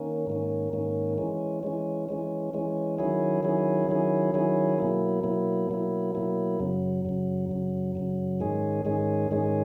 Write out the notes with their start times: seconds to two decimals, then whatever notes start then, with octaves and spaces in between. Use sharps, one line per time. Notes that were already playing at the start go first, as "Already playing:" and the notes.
Already playing: D#3 A#3 C#4
0.27 G#2 D#3 A#3 C#4
0.73 G#2 D#3 A#3 C#4
1.18 E3 G#3 C#4
1.63 E3 G#3 C#4
2.09 E3 G#3 C#4
2.53 E3 G#3 C#4
2.98 D#3 F#3 C#4 E4 G#4
3.43 D#3 F#3 C#4 E4 G#4
3.89 D#3 F#3 C#4 E4 G#4
4.34 D#3 F#3 C#4 E4 G#4
4.78 B2 F#3 A#3 E4
5.23 B2 F#3 A#3 E4
5.70 B2 F#3 A#3 E4
6.15 B2 F#3 A#3 E4
6.60 F#2 C#3 F#3
7.05 F#2 C#3 F#3
7.49 F#2 C#3 F#3
7.95 F#2 C#3 F#3
8.40 G#2 D#3 G#3 C#4 G#4
8.85 G#2 D#3 G#3 C#4 G#4
9.31 G#2 D#3 G#3 C#4 G#4